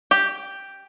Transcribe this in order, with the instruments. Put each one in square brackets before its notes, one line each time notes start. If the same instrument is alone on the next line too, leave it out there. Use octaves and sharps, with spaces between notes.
[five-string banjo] G4